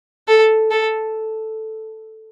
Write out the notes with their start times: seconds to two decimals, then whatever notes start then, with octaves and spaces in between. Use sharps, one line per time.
0.28 A4
0.71 A4